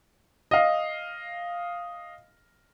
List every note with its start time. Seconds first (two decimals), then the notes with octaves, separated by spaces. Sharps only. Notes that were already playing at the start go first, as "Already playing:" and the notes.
0.51 D#5 F5